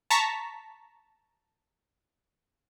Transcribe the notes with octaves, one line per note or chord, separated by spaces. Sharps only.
A5 A#5 C#6 B6